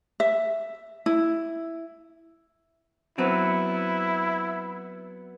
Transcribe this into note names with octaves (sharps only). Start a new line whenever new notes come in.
E5
E4
F#3 B3 C4 E4